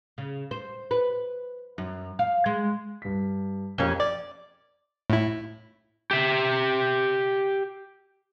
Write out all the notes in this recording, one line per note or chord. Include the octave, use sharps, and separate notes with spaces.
C#3
C5
B4
F#2
F5
G#3
G2 B6
F2 C#4 G4 A#4
D5
A2 E4
G4 E5